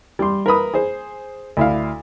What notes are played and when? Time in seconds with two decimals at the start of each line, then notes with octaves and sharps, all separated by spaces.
0.19 G3 C6
0.46 A#4 B4 B5 D#6
0.74 G#4 C5
1.57 D2 E4 F5